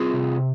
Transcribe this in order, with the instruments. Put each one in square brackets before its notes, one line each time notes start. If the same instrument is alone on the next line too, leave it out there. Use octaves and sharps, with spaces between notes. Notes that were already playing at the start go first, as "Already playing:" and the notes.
Already playing: [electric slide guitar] C4 F4 G#4
C3